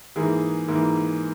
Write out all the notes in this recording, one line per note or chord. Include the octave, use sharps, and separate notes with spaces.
G#2 E3 A#3 G#4
G#2 E3 A#3